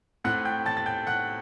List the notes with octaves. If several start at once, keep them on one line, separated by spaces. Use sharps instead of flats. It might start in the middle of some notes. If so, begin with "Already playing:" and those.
A2 A3 C4 F#5 F#6
G5 G6
A5 A6
A6
G5 G6
F#5 F#6